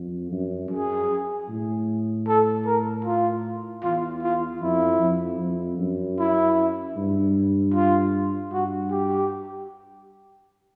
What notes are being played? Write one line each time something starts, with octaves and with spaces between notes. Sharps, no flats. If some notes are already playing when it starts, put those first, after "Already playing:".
Already playing: F2
F#2
F#2 G#4
A2
A4
A#4
F4
E2 F4
F4
F2 E4
F2
F2
F#2
E4
G2
F4
G2 F#4
G4